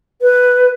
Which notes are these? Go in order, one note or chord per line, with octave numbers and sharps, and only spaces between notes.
B4